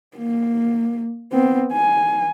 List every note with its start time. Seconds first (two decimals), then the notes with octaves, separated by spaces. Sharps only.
0.17 A#3
1.32 B3 C4
1.73 G#5